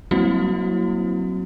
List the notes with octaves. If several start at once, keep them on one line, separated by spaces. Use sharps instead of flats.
F#3 G3 A#3 C4 E4 F#4